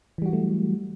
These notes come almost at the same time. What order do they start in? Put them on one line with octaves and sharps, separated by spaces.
E3 G3 F#4 F#3 A3